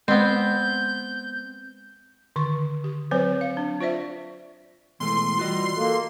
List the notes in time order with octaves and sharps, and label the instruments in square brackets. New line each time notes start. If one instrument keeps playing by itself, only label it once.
[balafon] G#3 [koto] B3 C4 [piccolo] G6
[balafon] D3 D#3 C#6
G4
F#3 C4 B4 C5
F5
D4
F4 C5 D5 E5
[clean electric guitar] B2 G#3 A3 [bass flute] E3 [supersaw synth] C6
[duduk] G3 [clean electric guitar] F4 F#4 D#5
[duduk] A#3 [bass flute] A4